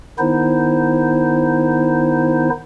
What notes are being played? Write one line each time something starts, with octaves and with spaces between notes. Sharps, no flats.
D#3 B3 D#4 E4 C5